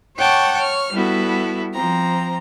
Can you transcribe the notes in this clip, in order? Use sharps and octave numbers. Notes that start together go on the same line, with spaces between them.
C#5 F#5 G5 A5 C#6 D6
C#5 F6
G3 B3 E4 F#4 A4
F3 C4 A#5